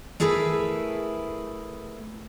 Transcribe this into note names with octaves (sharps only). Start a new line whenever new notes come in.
A3 E4 G#4 A#4 B4